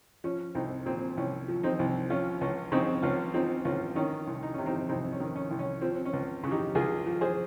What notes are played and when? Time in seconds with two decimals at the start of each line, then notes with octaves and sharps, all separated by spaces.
0.24 F3 C#4
0.55 C2 C4 D#4
0.86 A#2 C4
1.17 C2 C#4
1.48 F3
1.63 C4 D#4
1.79 C2
2.10 F3 C#4 F4
2.41 C#2 C#4
2.72 C#3 C4 D#4
3.02 C#2 C#4 F4
3.34 F3 C4 D#4
3.65 C#2 C#4 F4
3.96 D#3 C#4
4.27 C2
4.43 D#4
4.54 C3 C#4
4.66 C4 D#4
4.89 C2 C4 D#4
5.12 C#4
5.20 D#3
5.36 C#4
5.51 C2
5.59 C#4
5.81 F3 C4
6.05 C#4
6.13 C#2
6.44 C#3
6.51 D#4 G4
6.75 C#2 F4 G#4
7.06 F3
7.21 G#4 C5